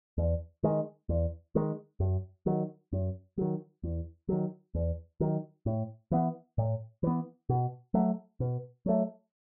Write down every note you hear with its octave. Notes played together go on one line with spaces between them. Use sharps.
E2
D#3 G#3
E2
D#3 G#3
F#2
D#3 F#3
F#2
D#3 F#3
E2
D#3 F#3
E2
D#3 F#3
A2
E3 B3
A2
E3 B3
B2
F#3 A3
B2
F#3 A3